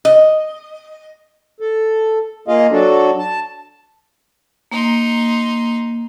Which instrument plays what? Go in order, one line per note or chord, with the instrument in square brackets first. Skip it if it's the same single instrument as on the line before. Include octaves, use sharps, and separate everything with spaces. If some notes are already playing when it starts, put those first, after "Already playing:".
[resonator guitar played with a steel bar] D#5
[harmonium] A4
A#3 F4 G#4 D#5 F5
F#3 D4 F#4 A4
A5
[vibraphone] A#3 [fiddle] D#4 C6